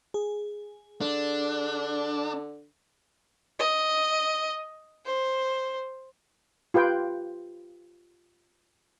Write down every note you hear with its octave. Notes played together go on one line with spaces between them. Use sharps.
G#4
D3 D4
D#5
C5
F4 G4 B4 G5